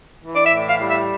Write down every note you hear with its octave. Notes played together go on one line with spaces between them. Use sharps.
E3
D5
E5
A2
F5
G3
E5